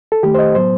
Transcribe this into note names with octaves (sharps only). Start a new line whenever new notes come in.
A4
D#3 A3 G4
C5
D#5
A2 F#3 B3 C5